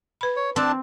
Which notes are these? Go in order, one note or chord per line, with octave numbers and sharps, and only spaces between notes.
B4 B5
C#5
C4 D4 A5